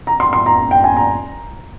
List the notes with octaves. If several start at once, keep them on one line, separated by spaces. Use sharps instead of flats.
A#5
C6
C6
A#5
G5
G#5
A#5